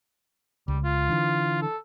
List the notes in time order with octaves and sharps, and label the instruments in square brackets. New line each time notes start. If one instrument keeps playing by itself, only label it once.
[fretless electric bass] C#2 [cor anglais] G3
[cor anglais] F4
[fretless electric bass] D3 E3
[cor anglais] A4